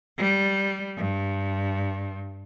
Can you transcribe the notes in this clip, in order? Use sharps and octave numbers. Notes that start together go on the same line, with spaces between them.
G3
G2